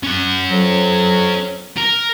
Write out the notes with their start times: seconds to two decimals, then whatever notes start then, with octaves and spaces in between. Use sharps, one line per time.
0.03 C#4 F#5
0.51 F2 F#3
1.77 A#4